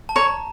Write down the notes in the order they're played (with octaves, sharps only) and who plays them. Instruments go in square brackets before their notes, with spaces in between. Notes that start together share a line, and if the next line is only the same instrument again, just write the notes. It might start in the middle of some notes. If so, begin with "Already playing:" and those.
[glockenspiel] A5
[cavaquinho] C#5 [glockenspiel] A#5